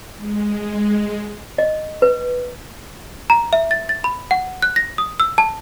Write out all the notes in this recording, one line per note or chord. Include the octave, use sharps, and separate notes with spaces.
G#3
D#5
B4
A#5
E5
A6
A6
B5
F#5
F#6
A#6
D#6
E6
A5